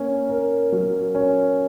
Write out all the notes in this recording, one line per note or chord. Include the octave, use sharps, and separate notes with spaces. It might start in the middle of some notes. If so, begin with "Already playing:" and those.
Already playing: A#3 C#4
A#4
F#3
C#4